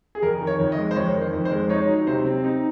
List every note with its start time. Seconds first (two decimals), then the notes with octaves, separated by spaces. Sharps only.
0.15 G#4
0.22 F2 A#4
0.41 D#3
0.47 C#5
0.60 F2
0.72 D#5
0.78 G#3
0.91 C5
0.96 F2 C#5
1.15 D#3
1.21 C5
1.33 F2
1.45 C5
1.51 G#3
1.69 D#4 C#5
1.89 F#3
2.07 C3 C5
2.25 C4
2.44 D#4